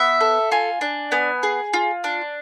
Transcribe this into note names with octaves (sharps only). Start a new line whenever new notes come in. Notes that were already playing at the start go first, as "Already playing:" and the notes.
Already playing: B3 E5
A4
F4 G#5
D4
B3 G#5
G#4
F4
D4